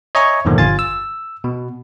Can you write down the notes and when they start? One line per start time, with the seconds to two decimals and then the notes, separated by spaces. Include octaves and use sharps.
0.15 C#5 D#5 E5 G#5 A#5 C#6
0.45 E2 G2 A#2 D3 D#3 F3
0.58 G1 F4 F5 G#5 A6
0.79 E6
1.44 B2